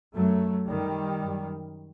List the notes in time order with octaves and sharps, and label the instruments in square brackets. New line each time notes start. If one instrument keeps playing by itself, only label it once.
[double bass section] F#2 F#3 A3
F#2 D#3 G3
F#2